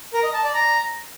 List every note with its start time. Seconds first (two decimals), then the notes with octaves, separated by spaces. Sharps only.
0.13 A#4
0.23 D#5
0.34 A5
0.44 D5
0.54 A#5